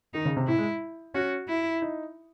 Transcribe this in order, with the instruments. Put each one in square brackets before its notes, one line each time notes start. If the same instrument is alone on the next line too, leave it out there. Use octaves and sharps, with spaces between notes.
[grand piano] D#3 [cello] D#4
[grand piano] C#3
C3
[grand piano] A2 [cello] E4
[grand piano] G#3
[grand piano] C#4 [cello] F#4
[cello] E4
[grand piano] D#4